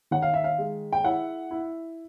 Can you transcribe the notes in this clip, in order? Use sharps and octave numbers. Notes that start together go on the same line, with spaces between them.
D#3 F#5
F5
E5
F5
G#3
G5
E4 F#5
E4